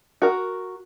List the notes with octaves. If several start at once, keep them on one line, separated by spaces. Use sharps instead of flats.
F#4 A#4